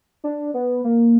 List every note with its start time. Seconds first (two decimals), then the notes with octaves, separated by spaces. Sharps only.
0.24 D4
0.54 B3
0.84 A#3